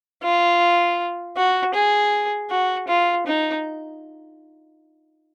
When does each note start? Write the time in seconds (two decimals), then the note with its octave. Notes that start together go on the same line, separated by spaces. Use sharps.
0.23 F4
1.37 F#4
1.74 G#4
2.50 F#4
2.88 F4
3.26 D#4